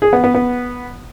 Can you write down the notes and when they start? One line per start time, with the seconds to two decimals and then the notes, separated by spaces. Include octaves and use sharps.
0.02 G#4
0.13 B3
0.24 B3
0.35 B3